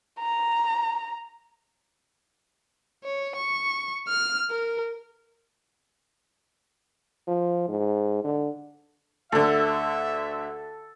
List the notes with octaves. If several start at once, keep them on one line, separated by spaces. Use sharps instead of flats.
A#5
C#5
C#6
F6
A#4
F3
G#2
D3
D2 D3 A4 E5